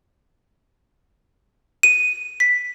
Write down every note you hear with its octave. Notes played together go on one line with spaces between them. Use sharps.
D#7
B6